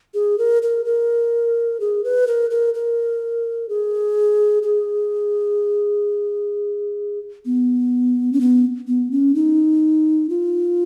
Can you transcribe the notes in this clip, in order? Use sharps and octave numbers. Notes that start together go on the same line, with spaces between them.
G#4
A#4
A#4
A#4
G#4
B4
A#4
A#4
A#4
G#4
G#4
B3
C#4
B3
B3
C#4
D#4
F4